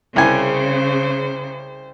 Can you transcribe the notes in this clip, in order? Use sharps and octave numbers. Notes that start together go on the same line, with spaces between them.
C2 C#3 C5 G#5